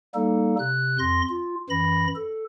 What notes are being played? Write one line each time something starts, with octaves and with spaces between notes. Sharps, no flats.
G3 A#3 D#4 A4
C3 F#6
F2 C6 A#6
F4
F#2 E3 B5 A#6
A4